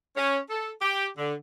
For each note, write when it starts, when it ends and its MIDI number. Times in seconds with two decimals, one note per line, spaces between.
0.16 0.37 61
0.50 0.70 69
0.82 1.06 67
1.17 1.33 50